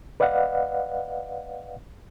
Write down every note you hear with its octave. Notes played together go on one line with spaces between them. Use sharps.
B4 D5 D#5 F5 F#5